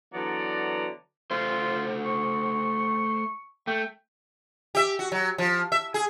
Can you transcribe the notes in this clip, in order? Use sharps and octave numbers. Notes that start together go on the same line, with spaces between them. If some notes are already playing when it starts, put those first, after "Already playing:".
D3 E3 F#3 B3 D5 A#5
A3 F4 C5
C#6
A3 G5
G4 E5
F#4
F#3
F3
E5
G#4